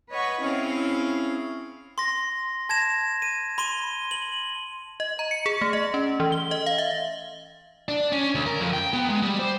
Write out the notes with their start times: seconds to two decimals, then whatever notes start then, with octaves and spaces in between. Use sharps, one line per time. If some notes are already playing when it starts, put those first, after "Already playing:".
0.10 B4 C#5 D#5 F#5 B5 C#6
0.43 C4 C#4 E4 G#4 C#5 F5
1.98 C6 A#6
2.69 A5 G#6 A#6 E7
3.22 D#7
3.58 B5 C6 D#7 G7
4.11 F#7
5.00 D#5
5.19 A#5
5.31 C#7
5.46 G#4
5.61 A3
5.73 D#5
5.94 C#4
6.20 E3
6.32 G7
6.51 D#5
6.66 F5
6.78 E5
7.88 D4
8.12 C#4
8.35 D2
8.46 A#4
8.61 F2
8.73 G5
8.93 B3
9.10 G#3
9.23 G3
9.39 C5